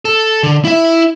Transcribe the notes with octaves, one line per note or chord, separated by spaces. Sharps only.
A4
D3
E4 E5